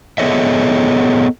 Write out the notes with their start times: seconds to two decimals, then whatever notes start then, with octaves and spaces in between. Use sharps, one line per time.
0.18 B3 G#4 A4 C#5 D#5 E5